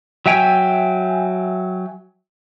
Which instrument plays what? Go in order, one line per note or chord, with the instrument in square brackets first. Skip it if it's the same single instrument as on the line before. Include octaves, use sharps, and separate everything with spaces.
[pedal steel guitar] F#3 E5 G5 G#5